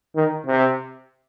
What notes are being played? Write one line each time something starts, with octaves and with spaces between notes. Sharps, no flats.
D#3
C3